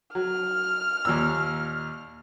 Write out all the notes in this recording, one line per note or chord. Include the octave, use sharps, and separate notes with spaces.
F#3 F6
D#2 A#2 E6